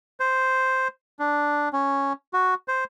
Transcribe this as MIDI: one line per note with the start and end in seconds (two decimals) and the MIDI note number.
0.20 0.88 72
1.19 1.69 62
1.73 2.13 61
2.33 2.54 66
2.68 2.84 72